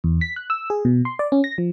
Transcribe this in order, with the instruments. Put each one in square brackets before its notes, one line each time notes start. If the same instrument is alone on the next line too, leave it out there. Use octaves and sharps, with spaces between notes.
[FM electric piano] E2
B6
F#6
E6
G#4
B2
C6
D5
C#4
A#6
F3